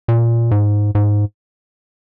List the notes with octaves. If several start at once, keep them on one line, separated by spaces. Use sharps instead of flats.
A#2
G#2
G#2